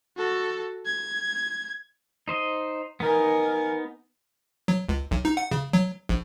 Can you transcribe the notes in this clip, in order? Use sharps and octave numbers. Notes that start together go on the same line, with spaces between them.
F#4 A4
G#6
D#4 C5 D#5
B3 D#4 A#4 G#5
F#3
C#2
B1
D#4
F#5
C#3
F#3
A#1